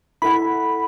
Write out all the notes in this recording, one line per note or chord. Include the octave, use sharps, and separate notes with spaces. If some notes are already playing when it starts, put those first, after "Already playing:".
E4 A4 F#5 B5